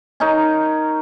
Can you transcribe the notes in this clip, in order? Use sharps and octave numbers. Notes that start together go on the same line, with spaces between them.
C#4 D#4 A#4